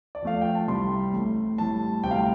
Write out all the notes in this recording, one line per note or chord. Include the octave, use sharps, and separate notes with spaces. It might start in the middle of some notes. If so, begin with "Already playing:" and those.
D5
F2 F3 A3 F5
G5
A5
C2 C3 G3 C6
A1 A2 A3
A1 A2 G3 A5
D2 C3 G3 G5
F5
G5